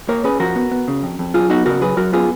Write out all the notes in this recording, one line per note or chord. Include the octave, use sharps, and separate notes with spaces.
A#3 A#4 C#5
C#4 G#4 B4
F3 F#4 A#4
B3
B3
C#3
F2
F2
F#3 F4 G#4
B3 D#4 F#4
C#3 F#4 A#4
F#3 G#4 B4
F#3 F#4 A#4
B3 F4 G#4